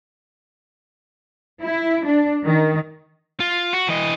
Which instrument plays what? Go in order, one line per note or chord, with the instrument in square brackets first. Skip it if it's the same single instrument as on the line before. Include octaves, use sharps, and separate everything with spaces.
[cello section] E4
D4
D#3
[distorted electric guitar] F4
F#4
E3 D#5